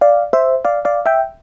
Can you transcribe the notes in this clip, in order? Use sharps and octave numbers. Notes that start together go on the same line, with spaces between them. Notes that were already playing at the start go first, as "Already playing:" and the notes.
D5 F5
C5 E5
D5 F5
D5 F5
E5 G5